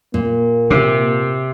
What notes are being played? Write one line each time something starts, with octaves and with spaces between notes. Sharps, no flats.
A#2 A#3
C3